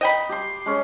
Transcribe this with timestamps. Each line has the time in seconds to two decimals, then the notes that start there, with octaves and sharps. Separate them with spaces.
0.01 D#5 G5 B5
0.29 G4 C6
0.66 G#3 C#4